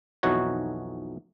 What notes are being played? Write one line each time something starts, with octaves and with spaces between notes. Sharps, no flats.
B1 F2 E3 D#4 F#4 C#5